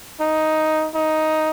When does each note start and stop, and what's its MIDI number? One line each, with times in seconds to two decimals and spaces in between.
0.21 0.89 63
0.95 1.51 63